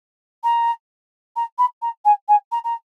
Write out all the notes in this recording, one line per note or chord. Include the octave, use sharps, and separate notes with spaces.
A#5
A#5
B5
A#5
G#5
G#5
A#5
A#5